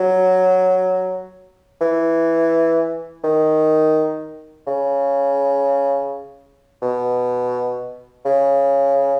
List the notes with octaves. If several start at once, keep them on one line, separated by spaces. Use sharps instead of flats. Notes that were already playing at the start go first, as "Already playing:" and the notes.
Already playing: F#3
E3
D#3
C#3
B2
C#3